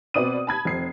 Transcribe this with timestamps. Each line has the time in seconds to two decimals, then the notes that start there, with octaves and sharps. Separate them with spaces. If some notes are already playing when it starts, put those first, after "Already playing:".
0.14 B2 C4 B4 D5 D#6 D#7
0.47 A5 B5 G#6
0.65 F1 C4 C7